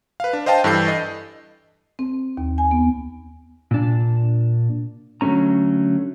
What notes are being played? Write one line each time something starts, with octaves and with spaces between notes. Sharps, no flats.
B4 F5
D4
C5 D#5 F5 G5 A5
G2 E3 A4 G6 C7
D#5
C4
D#2
G#5
B3
A#2 D4
D3 F#3 A3 C#4 A#5